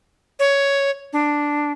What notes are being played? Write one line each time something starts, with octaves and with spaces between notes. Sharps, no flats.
C#5
D4